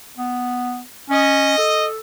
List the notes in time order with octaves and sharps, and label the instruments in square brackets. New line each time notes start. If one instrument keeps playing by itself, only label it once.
[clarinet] B3
[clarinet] C#4 [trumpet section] D#5
[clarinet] A4